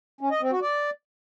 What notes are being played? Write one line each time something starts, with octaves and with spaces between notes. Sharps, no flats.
C#4
D#5
C4
F#4
D5